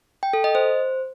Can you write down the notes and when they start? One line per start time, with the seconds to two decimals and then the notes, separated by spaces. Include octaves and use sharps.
0.23 G5
0.33 A4
0.44 D#5
0.55 C5